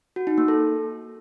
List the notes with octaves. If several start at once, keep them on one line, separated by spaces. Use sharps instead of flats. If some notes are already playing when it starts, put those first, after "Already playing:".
F#4
D#4
A#3
A4